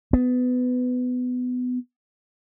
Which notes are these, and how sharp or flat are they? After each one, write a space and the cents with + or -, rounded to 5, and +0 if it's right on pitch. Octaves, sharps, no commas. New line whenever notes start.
B3 +20